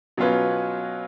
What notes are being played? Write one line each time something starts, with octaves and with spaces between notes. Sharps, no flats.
B2 F#3 C#4 F4 B4